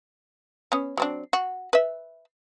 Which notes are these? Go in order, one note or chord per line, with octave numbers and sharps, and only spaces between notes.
B3 C#4
F#3 C4 D4
F#4
B4 E5